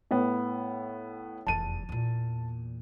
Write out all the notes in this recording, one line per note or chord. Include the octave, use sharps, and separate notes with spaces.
A2 B3
F1 E2 A5 D#7
E2 A#2